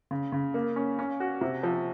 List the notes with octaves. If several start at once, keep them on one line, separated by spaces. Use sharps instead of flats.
C#3
C#3
A#3
C#4
C#4
F#4
C3
F3